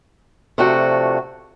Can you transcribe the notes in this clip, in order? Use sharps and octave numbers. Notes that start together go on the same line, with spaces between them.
C3 F3 A3 D4 F#4